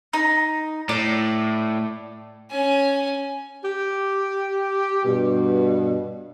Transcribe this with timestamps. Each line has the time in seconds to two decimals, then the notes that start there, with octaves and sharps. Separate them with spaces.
0.13 D#4
0.89 A2 D5
2.51 C#4 G#5
3.65 G4
5.05 G2 B2